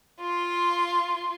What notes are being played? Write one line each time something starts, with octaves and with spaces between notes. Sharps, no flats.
F4 C6